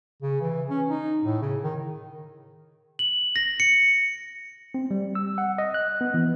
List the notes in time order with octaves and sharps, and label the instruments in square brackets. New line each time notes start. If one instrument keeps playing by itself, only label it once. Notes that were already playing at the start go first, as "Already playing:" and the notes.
[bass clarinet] C#3
E3
C#4
D#4
A2
C#3
D#3
[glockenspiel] F#7
A#6
C#7
[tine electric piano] C4
G3
E6
F#5
D#5
F#6
B3
E3